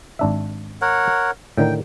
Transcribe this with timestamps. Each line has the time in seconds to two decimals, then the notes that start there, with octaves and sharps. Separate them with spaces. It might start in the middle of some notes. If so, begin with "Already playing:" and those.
0.19 G#1 D4 E5
0.82 A#4 C#5 F#5
1.58 A2 D3 D#3 G5